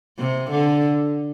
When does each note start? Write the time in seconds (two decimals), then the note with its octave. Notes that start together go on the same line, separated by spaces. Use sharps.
0.19 C3
0.50 D3